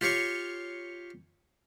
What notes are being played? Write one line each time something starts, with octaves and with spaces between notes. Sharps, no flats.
F4 G4 C#5 F5 C#6